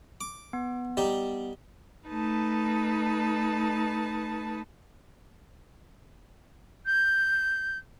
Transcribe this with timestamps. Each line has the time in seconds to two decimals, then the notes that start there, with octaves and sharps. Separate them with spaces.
0.21 D6
0.53 B3
0.97 G3 D#4 G4
2.08 A3 D#4 B4 A5
6.86 G6